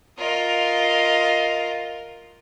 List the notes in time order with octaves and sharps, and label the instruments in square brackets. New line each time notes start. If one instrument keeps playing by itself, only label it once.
[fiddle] F4 A#4 [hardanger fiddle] D#5